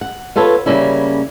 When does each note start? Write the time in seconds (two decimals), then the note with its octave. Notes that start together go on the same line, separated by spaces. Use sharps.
0.01 F#5
0.36 B3 F4 A4 B4 C#5
0.66 C#3 F3 G3 A#3 C#4 E4